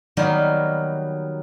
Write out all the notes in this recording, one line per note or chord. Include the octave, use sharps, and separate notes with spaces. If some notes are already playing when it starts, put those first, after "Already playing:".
D#3 F#3 G3 A#3 B3